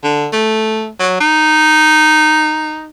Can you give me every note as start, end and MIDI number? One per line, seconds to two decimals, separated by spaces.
0.03 0.27 50
0.32 0.88 57
0.99 1.20 54
1.20 2.89 63